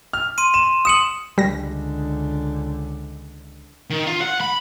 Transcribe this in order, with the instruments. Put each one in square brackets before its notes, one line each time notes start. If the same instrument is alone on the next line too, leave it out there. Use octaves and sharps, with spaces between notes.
[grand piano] F6
[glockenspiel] C6 D#7
[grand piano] E7
[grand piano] D#6 C#7 [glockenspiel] E7 F#7
[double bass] C#2 D3 [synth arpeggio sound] G3 A#6
[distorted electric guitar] D#3
F4
F#5
B5